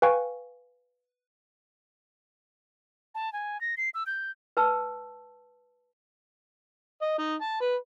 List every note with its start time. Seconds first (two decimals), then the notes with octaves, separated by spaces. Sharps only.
0.02 B4 F5 G5 G#5 C#6
3.15 A5
3.33 G#5
3.61 A#6
3.77 C7
3.94 E6
4.06 G6
4.57 B4 G5 A5 E6
7.01 D#5
7.18 D#4
7.41 A5
7.61 B4